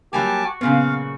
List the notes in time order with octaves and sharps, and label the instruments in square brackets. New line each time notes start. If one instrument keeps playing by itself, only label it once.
[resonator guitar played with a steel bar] F#3 G3 A#3 [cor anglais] G4 [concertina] G#5 A5 D6
[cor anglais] F#4
[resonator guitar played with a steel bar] A#2 C#3 F#3 [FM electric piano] B3 [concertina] F5